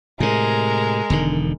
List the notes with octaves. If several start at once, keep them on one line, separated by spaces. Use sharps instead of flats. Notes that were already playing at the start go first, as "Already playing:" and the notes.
A2 C3 G#3 A#4
E1 D3 D#3